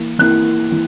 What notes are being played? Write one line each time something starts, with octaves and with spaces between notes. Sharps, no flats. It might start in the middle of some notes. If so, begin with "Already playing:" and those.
Already playing: E3 A#3 E4
E3 A#3 E4 F#6
E3